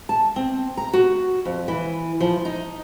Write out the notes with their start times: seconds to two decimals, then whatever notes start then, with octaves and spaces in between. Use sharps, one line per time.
0.09 A5
0.36 C4
0.77 A#5
0.93 F#4
1.45 F2
1.68 E3
2.20 F3
2.45 D#4